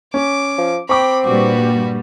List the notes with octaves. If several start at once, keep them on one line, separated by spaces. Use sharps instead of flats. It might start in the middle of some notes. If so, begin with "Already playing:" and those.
C#4 D6
F3
C4 G5 B5 C#6 D6
G2 A#2 G3 F#4 B4